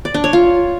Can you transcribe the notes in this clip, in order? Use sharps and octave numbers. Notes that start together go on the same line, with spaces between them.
D5
D4
C#5
F4